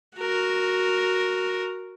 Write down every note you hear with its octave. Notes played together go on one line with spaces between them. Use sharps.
F#4 A#4